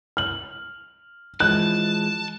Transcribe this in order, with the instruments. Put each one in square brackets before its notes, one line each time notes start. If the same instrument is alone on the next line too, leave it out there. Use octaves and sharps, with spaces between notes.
[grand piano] F6 F#7
[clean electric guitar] E3 F3 G#3 [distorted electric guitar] A5 [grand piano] F#6